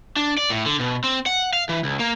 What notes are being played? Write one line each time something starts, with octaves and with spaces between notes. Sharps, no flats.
D4
D5
A2
D3
B2
C4
F#5
F5
E3
C#2
A#3